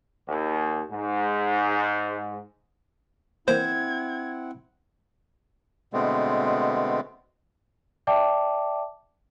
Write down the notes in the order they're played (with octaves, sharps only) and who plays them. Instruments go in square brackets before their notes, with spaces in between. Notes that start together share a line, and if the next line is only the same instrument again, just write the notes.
[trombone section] D#2
G#2
[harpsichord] E3 A#3 [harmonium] C4 E4 F#5 [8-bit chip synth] C5 [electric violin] G#6
[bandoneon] B2 D3 G#3 A3 B3 C4
[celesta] D5 E5 G5 A5 D6